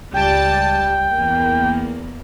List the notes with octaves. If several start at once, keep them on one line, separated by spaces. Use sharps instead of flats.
C#2 G3 G5 A5
E2 A#3